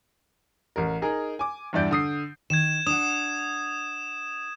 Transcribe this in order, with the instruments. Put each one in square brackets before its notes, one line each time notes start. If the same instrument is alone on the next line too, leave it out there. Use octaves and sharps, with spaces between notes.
[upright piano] A1 A#4
D#4 G#4 A#4
G#5 D6
E2 G2 E4 D5 G6 D7
D3 D#6 C7
[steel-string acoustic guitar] D#3 [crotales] G#6 E7
[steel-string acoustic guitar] D4 F#5 [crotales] D#6 E7